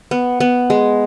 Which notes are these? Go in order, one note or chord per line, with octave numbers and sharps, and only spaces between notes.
B3
B3
G#3